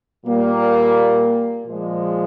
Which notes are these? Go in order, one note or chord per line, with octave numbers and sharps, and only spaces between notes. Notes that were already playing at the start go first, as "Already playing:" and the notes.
A#2 G3 A#3
A#2 F3 G#3